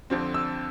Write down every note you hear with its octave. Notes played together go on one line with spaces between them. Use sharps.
F2 D3 F3 C4
E6